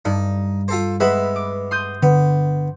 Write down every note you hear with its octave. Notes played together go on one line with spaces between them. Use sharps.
G2 D#4
F4 A4 C5
G#3 B3 B4 E5
D6
C6 D#6 G6
D3 B3